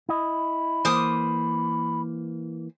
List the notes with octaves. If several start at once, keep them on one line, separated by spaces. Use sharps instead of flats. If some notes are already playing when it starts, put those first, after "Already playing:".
E4 D#5 B5
E3 A#3 C5 D6 D#6